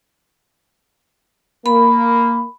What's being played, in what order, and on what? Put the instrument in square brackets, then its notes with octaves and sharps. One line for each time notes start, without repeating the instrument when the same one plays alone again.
[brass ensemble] A#3 [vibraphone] B5